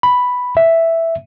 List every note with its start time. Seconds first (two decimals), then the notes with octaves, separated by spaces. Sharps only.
0.03 B5
0.57 E5